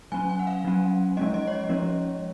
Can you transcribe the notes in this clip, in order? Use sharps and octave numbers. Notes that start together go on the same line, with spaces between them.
F#3 C#4 G#5
G#5
F#5
F5
F#3 C#4
F3 G#3 C#4 D#5
D#5
C#5
D#5
F3 G#3 C#4